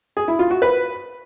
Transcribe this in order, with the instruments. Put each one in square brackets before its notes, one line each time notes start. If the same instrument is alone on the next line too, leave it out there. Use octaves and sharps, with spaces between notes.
[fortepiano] G#4
E4
F4
F#4
B4